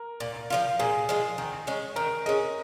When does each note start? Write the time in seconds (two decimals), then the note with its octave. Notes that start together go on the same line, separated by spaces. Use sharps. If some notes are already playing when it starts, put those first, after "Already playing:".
Already playing: A#4
0.20 A#2
0.50 F3 G#3 F4
0.79 A#2 G#4
1.09 F3 G#3 F4
1.38 D#3
1.67 G#3 C#4
1.96 D#3 A#4
2.26 G#3 C#4 D#5